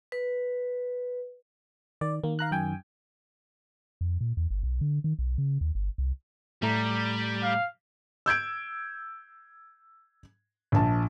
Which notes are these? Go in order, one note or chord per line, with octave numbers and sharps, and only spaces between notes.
B4
D#3 D5
D#3 A#3
F5 A#5 F#6
F#2 G5 G#5
F2
A#2
E2
G1
B1
D3
D#3
B1
C#3
D#2
G1
C2
A2 G3 A3 A#5
F5
E6 G6 G#6 D7
A#1 A5